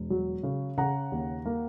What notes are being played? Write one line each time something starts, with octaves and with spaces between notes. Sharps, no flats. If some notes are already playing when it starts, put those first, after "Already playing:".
Already playing: E1
F#3
C#3
C#3 F#5 A#5
D#2
A#3